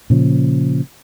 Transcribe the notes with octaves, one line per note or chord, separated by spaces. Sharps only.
A#2 C#3 F3